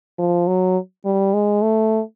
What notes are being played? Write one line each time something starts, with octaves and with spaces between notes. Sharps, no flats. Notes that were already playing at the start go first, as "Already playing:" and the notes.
F3
F#3
G3
G#3
A3